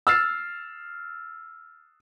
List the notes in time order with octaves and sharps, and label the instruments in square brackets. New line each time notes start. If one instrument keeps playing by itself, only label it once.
[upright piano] E6 F6 A6 C7